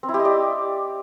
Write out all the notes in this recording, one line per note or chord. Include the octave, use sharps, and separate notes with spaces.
C4
E4
G4
D#5
D5